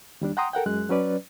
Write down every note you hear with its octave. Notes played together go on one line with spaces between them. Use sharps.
D#2 G3 D4
F#5 G5 A#5 C6 D#6
A4 A#4 F#5 G5
F#2 G#3 F#6
F#3 C#4 B4 D5